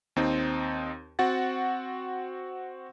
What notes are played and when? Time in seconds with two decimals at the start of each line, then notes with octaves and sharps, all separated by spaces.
0.16 D#2 C4 D#4
1.19 C4 F#4 F#5 A6